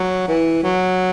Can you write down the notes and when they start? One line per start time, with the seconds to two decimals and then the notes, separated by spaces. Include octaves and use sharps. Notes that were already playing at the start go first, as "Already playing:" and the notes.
Already playing: F#3
0.28 E3
0.63 F#3